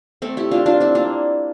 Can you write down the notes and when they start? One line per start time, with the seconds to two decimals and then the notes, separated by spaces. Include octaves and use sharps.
0.22 A3 C4
0.37 E4 G4
0.51 D4 F4
0.66 D4 F4
0.80 C4 E4
0.95 A#3 D4